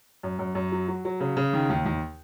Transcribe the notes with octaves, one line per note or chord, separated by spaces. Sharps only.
F#2
F#2
F#2
F#3
F#3
F#3
C#3
C#3
D#3
D#2
D#2